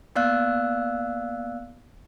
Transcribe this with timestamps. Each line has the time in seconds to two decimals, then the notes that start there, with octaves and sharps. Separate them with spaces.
0.16 A#3 B3 D5 F5 E6 F#6